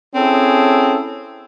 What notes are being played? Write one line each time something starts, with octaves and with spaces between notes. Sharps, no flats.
C4 C#4 E4 G#4 A4